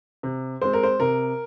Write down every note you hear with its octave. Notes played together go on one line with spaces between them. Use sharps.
C3
G#3 C4 C5
A#4
C5
C3 A#4